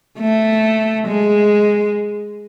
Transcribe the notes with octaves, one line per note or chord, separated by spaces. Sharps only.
A3
G#3